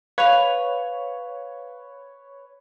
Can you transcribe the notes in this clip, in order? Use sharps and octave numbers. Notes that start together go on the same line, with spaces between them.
B4 C#5 F5 F7